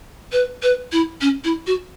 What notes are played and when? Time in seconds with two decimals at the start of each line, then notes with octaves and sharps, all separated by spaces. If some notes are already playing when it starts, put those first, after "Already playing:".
0.32 B4
0.63 B4
0.92 E4
1.21 C#4
1.44 E4
1.67 F#4